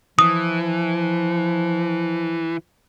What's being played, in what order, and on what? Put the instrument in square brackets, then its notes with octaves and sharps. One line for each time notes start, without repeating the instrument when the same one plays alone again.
[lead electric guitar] E3 [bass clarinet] F3 [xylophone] D#6